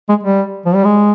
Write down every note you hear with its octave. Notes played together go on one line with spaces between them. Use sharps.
G#3
G3
F3
G3
G#3